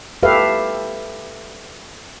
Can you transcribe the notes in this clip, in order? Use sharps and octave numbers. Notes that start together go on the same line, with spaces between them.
G4 A4 B4 E5 F5